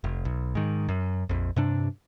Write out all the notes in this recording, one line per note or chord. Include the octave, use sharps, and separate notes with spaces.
F1
B1
G#2 D#3
F#2
A#1 F2
G2 C3 D4